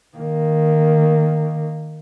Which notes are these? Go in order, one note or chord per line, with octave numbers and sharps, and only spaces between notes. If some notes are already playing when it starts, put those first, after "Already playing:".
D#3 A#3